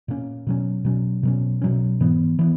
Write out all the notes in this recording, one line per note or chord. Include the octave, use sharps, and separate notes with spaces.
A#2 A#3 C#4
B2 F#3 C#4
B2 F#3 C#4
B2 F#3 C#4
B2 F#3 C#4
G#2 E3 B3
E3 B3